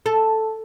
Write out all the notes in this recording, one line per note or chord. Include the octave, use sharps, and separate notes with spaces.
A4